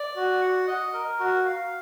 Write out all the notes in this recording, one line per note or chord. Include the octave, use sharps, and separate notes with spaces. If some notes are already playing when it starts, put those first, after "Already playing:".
Already playing: D5
F#4
F#5
D#5
A#4
F#4
F5